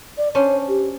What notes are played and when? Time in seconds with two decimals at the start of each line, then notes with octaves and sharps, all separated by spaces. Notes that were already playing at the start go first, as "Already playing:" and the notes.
0.18 D5
0.35 C#4 D4 C5 C#5
0.68 G4